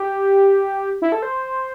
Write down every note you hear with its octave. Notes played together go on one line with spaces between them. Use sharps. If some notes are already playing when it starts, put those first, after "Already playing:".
Already playing: G4
E4
A4
C5